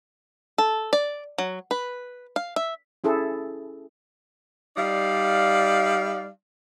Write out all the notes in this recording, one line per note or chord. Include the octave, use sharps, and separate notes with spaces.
A4
D5
F#3
B4
F5
E5
C#4 E4 G#4 A4
G3 D#4 D5 F5